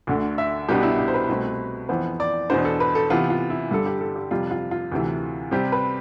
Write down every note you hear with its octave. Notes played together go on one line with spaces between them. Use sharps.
D2 D3 A3
E5
C2 B2 B3 D4 G4
E4
G4
C5
B4
C2 B2 A3 C4
F2 E3 B3 C5
D5
E2 B2 B3 D4 C5
A4
B4
A4
C3 E3 B3 F4
F4
E4
G2 D3 G3 A4
G4
A4
G4
F2 C3 G3 F4
F4
F4
D2 C3 E3
C3 G3 C4 G4
B4